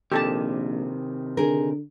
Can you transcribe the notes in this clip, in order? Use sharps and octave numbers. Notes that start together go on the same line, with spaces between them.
A#1 C3 D#3 G4 A4 A5
D3 G#4 A#4